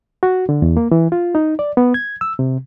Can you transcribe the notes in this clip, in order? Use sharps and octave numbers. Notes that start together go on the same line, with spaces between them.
F#4
D3
E2
A#3
E3
F4
D#4
D5
B3
G#6
E6
C3